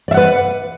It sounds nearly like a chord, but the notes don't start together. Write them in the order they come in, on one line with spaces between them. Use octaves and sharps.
D5 E5 F#5 B4